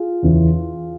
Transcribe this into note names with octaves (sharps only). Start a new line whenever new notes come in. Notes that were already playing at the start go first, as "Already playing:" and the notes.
Already playing: F4 G#4
E2 C#3 E3